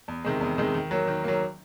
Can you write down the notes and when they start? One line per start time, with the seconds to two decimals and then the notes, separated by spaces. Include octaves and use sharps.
0.08 E2
0.25 C3 D#3 G#3
0.41 E2
0.58 C3 D#3 G#3
0.74 D#3
0.91 F#3 A#3
1.08 D#3
1.24 F#3 A#3